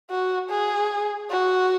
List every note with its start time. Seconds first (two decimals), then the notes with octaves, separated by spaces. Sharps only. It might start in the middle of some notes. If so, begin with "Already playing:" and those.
0.11 F#4
0.50 G#4
1.30 F#4